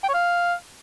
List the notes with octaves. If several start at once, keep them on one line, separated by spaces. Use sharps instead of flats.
G5
C#5
F5